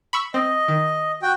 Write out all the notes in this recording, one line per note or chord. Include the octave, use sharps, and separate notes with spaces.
B5 C#6 E6
C4 D#5
D#3
F#4 G5